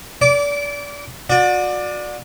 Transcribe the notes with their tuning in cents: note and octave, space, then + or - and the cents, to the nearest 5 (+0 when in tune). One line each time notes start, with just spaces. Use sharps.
D5 -30 D6 -15
F#4 -35 D5 +15